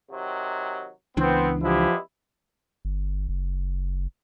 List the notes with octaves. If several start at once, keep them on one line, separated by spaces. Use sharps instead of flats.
C3 D#3 F#3
C#2 E3 B3 C4 D4
E2 F3 G#3 E4 G4
G1
F#1